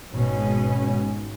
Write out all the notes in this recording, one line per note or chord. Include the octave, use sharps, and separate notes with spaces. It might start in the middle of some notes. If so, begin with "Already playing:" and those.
G#1 B2 D#3 G#3 C#4